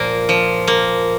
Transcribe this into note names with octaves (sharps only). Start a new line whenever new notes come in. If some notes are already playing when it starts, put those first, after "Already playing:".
Already playing: A#2 F3 A#3
F3
A#3